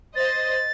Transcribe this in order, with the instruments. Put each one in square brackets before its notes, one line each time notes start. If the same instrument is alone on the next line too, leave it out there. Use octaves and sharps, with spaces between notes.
[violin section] C5 D#5 [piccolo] A6